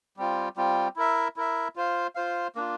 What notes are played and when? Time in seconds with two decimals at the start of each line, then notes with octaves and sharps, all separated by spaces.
0.17 G3 C4 F4
0.56 G3 C4 F4
0.96 E4 A#4 E5
1.36 E4 A#4 E5
1.76 F4 C5 F5
2.15 F4 C5 F5
2.55 A#3 D4 F4